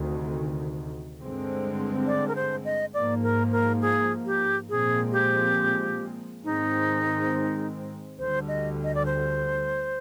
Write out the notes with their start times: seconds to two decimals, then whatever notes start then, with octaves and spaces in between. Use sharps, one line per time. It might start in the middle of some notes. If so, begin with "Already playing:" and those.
Already playing: D2 C3 D#3
1.19 G2 D3 G#3 C4
2.07 D5
2.28 A#4
2.35 C5
2.65 D#5
2.94 G#2 F3 A#3 D5
3.23 A#4
3.52 A#4
3.82 G#4
4.26 G4
4.69 A#2 F3 G#3 C4 G#4
5.12 G4
6.44 G#2 D#3 G#3 C4 D#4
8.18 D2 D3 G3 C5
8.48 D#5
8.84 D#5
8.95 D5
9.06 C5